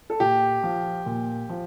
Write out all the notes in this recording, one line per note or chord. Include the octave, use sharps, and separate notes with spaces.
A4
A#2 G4
F3
A#2
F3